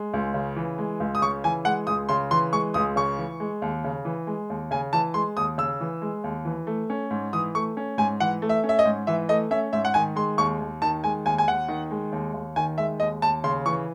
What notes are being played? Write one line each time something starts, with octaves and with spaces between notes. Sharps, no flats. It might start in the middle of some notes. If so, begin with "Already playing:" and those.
Already playing: G#3
C#2
C#3
E3
G#3
C#2
D#6
C#3 C#6
E3 G#5
G#3 F#5
C#2 D#6
C#3 C6
E3 C6
G#3 C#6
C#2 D#6
C#3 C#6
E3
G#3
D#2
C#3
E3
G#3
D#2
C#3 G#5
E3 A5
G#3 C6
D#2 D#6
C#3 E6
E3
G#3
D#2
E3
A3
C#4
G#2
E3 D#6
A3 C#6
C#4
G#2 G#5
E3 F#5
A3
E5
C#4
E5
D#5
G#2
E3 E5
A3 D#5
C#4 E5
G#2 E5
F#5
D#3 G#5
G#3 C6
D#2 C#6
D#2
D#3 A5
G#3 G#5
D#2 G#5
G#5
D#2 F#5
D#3
G#3
D#2
D#2
D#3 G#5
G#3 E5
D#2 D#5
D#2 A5
C#3 C6
E3 C#6